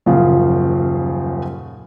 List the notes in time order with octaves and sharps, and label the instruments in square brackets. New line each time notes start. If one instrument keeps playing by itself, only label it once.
[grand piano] D#1 F#2 C#3 F3 F5